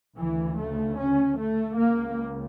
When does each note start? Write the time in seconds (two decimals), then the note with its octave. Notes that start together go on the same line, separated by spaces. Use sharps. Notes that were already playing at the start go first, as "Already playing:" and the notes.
0.17 D2 C#3 E3
0.58 A3
0.98 C#4
1.39 A3
1.78 C#2 C#3 A#3